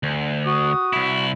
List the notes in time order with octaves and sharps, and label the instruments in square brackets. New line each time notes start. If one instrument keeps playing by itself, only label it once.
[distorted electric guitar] D2
[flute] F#4 [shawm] D#6
[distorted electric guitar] C2 E4